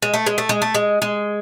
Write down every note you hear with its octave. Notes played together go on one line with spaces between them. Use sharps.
G#3
A3
G#3
A3
G#3
A3
G#3
G#3